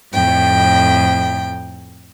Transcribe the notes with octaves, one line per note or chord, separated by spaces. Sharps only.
F2 A2 G5